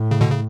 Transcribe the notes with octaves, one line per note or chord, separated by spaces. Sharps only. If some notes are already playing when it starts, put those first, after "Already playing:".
Already playing: A2
C#3
B2 D3
C#3